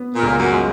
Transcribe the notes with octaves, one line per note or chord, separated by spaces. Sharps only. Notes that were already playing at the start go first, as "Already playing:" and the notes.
Already playing: B3
A#2
C#2
F#2
G#3